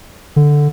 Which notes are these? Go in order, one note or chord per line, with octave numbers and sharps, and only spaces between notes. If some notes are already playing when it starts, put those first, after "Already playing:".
D3